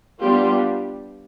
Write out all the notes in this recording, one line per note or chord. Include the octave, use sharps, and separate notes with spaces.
G3 B3 D4 F4 G4